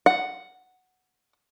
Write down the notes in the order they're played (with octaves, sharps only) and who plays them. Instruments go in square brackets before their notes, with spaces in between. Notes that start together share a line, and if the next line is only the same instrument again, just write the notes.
[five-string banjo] F#5